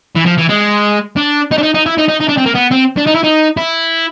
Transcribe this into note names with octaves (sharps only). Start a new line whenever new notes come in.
E3
F3
E3
G#3
D4
D#4
D4
D#4
D#4
E4
D#4
D#4
D#4
D4
C4
A#3
B3
C4
D4
D#4
E4
D#4
E4